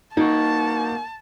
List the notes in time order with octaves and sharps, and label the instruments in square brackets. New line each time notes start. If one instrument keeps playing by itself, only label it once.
[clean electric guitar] A#3 F#4 [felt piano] D#4 [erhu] A5